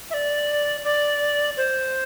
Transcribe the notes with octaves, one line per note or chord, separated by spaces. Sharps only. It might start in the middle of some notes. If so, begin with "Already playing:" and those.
E5
D5
D5
C5